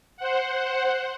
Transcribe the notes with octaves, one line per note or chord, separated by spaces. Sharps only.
C5 F#5